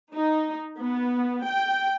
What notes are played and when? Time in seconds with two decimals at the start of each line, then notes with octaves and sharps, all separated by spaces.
0.13 D#4
0.80 B3
1.45 G5